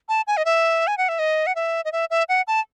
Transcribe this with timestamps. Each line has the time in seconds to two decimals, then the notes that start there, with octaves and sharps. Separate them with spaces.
0.09 A5
0.27 G#5
0.37 D#5
0.45 E5
0.87 G#5
0.98 F#5
1.09 E5
1.19 D#5
1.47 F#5
1.55 E5
1.85 D#5
1.92 E5
2.10 E5
2.29 F#5
2.47 A5